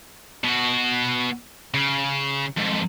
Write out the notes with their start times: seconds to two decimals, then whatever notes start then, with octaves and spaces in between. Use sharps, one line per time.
0.44 B2 F#4
1.74 C#3
2.57 F2 G#2